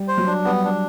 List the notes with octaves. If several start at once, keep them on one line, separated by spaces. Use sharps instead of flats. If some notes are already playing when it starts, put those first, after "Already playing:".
Already playing: G3
C5
F#3
D4
G3 B3
D4